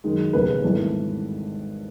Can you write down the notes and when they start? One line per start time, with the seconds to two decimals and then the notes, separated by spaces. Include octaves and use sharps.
0.04 F#2 D#3 G#3
0.33 E1 D#2 C#3 B4
0.64 G#1 G2 E3 A3